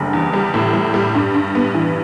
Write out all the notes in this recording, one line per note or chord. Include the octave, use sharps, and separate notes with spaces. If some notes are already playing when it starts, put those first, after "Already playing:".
Already playing: F#1 D3 G3
E2
G3
A2
G3
G3
G2
G2
B3
E3